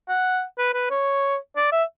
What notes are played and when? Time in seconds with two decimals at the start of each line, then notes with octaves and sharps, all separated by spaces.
0.09 F#5
0.58 B4
0.74 B4
0.90 C#5
1.56 D5
1.72 E5